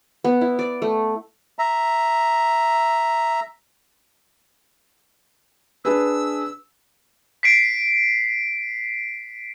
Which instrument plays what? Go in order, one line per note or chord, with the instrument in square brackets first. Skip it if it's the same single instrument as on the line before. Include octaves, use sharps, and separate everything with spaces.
[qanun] B3
E4
D5
A3
[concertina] E5 A#5
[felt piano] D4 G#4 B4 [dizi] E6
[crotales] B6 C7 D7